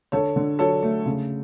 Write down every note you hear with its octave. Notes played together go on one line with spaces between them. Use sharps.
D3 A4 C#5
D3
F#3 A4 C#5
A3
C#3